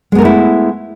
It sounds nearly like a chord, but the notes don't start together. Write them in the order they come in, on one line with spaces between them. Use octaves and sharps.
G#3 B3 A#4 A3 E4